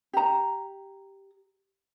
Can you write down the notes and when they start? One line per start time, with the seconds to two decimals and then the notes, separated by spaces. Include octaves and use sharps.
0.13 G4 A#5